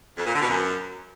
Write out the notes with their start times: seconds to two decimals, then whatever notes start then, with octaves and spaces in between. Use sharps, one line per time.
0.18 F2
0.26 A#2
0.34 D3
0.42 B2
0.50 F#2